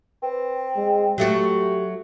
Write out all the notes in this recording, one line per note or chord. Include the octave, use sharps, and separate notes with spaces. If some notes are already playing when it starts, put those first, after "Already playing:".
C4 B4
G#3
F#3 A3 F#4 G4